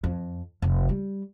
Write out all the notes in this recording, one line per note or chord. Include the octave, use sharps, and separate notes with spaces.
F2
F1
G3